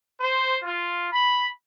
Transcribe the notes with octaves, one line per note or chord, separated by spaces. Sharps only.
C5
F4
B5